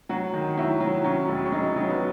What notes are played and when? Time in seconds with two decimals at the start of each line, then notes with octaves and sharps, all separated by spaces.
0.09 F#3 F#4
0.34 D#3
0.57 F#3 E4
0.80 F#3
1.04 F#3 C#4
1.28 E1
1.45 C#4
1.52 F#3 D#4
1.76 F#3
1.90 B3